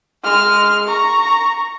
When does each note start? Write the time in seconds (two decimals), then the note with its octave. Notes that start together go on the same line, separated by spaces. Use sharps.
0.23 G#3 F6
0.88 A#5 C#6